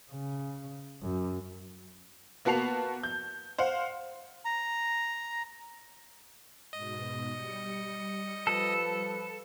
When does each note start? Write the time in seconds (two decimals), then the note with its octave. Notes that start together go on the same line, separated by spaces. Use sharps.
0.12 C#3
1.03 F#2
2.45 A#3 B3 F#4 A5 C7 F7
3.03 G6
3.58 C5 F5 F#5
4.45 A#5
6.73 G#2 B2 D#5
7.29 G3 C#7
8.47 F3 A4 B4